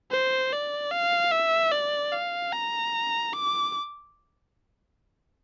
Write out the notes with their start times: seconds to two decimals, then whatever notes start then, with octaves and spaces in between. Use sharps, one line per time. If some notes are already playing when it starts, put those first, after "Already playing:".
0.11 C5
0.52 D5
0.92 F5
1.31 E5
1.72 D5
2.12 F5
2.53 A#5
3.33 D6